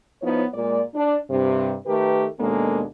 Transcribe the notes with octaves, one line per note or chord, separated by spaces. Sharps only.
F3 B3 D#4 E4 C#5
A#2 G#3 D5
D4
G2 C3
D#3 A3 G4 A#4 B4
D#2 B2 G#3 A#3 D4 A4